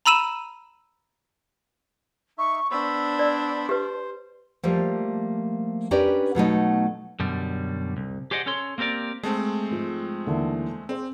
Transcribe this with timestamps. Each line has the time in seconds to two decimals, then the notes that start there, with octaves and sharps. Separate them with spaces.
0.05 A#5 B5 E6 D#7 E7
2.38 D#4 E5 C#6
2.71 B3 D4 C5 B5 E6
3.19 D5
3.69 G4 B4 C5
4.63 F3 G3 A3 A#3
5.91 C#4 D4 G4 A#4 B4 D5
6.35 B2 F#3 A3 D#4
7.20 F#2 B2 D3 G3
7.97 C2
8.31 G4 G#4 C5 D5 D#5 F#5
8.46 C#4 A4 C#5 C6
8.78 A#3 C4 G4 A#4 D5
9.23 G#3 A3 C4 A5
9.71 G#2 F3
10.27 D#2 D3 E3
10.89 C4 G#4 C5